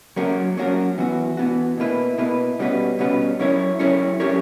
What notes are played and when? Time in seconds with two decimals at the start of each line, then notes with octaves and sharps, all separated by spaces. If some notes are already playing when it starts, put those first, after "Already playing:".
0.16 F#3 A#3 C#4 F#4 A#4
0.57 F#3 A#3 C#4 F#4 A#4
0.98 E3 B3 F#4
1.37 E3 B3 F#4
1.78 B2 A#3 E4 B4
2.18 B2 A#3 E4 B4
2.59 B2 G3 C#4 F#4 B4
2.99 B2 G3 C#4 F#4 B4
3.39 F#3 C#4 E4 A#4 C#5
3.79 F#3 C#4 E4 A#4 C#5
4.20 F#3 C#4 G4 A#4 C#5